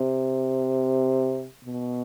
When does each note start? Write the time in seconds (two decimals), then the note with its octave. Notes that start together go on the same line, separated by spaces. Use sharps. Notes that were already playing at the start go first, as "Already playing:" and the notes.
Already playing: C3
1.65 B2